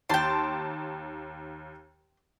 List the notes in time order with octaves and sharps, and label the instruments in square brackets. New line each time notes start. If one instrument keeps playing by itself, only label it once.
[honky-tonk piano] D#2 A5 A6 [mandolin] G5 C6